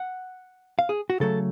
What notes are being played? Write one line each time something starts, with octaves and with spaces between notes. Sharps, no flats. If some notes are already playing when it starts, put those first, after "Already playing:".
Already playing: F#5
F5
G#4
F#4
C#3 F#3 A3 A4